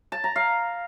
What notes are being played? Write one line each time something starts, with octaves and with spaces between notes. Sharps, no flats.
A5
A#5
F5